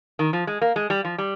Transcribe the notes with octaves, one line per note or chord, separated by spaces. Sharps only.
D#3
F3
G#3
A#3
G#3
G3
F3
G3